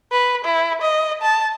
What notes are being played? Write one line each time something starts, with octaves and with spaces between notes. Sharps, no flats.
B4
E4
D#5
A5